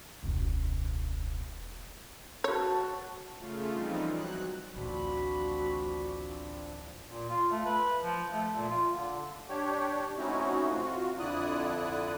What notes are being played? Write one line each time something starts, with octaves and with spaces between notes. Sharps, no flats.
E1 C#2
F#4 C#5 A5
C#3 A3 F4
E3 F3 G3 C4 D#4
F#3 F#6
A1 D2 F3 C4 D4 F#4 B5
A#2
F4
A3
B4
F3
A3
A#2
F4
D3
D4 G4 C#5
A3 C4 C#4 D#4 E4 F#4
C3 F4 F#4
F2 D3 E4 D5 D#6 F#6